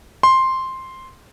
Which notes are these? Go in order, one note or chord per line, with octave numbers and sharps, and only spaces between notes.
C6